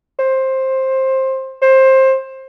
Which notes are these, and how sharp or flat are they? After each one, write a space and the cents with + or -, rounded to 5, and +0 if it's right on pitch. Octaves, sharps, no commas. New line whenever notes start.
C5 +15
C5 +20